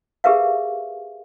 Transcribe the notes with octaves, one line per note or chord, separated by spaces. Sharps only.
G4 G#4 A#4 B4 E5 F5